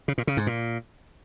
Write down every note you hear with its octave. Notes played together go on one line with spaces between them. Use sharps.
C#3
A#2
C#3
G#2
A#2